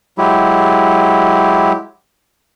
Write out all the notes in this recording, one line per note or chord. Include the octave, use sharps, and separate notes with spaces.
F#3 G#3 E4 G4